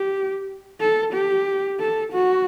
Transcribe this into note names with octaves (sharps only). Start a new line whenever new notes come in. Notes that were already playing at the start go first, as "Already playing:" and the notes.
Already playing: G4
A4
G4
A4
F#4